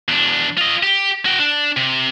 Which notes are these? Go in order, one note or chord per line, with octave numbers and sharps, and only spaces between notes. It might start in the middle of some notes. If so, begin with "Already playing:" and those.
E2 D4
F4 D#5
G4
F#4 G5
D4
C3